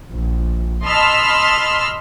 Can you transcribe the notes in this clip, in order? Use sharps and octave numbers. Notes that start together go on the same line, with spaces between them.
A#1
D#5 A5 B5 C6 E6 F6